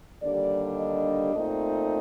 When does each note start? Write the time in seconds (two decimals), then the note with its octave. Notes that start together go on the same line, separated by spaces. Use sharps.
0.22 D#2 D3 G3 D4 D5
0.77 D#5
1.32 A#2 A3 C4 D#4